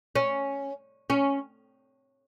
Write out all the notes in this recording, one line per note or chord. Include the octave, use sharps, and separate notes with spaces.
C#4
C#4